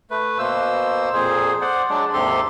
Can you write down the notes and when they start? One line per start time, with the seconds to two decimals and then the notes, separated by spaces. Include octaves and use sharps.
0.11 A3 B4
0.39 B2 A#3 C5 E6
1.13 F2 A#2 G#4 C5
1.61 C5 D5 F#5
1.90 F#3 G#3 D4 D5
2.13 D#2 G#2 C3 G4 A4 C6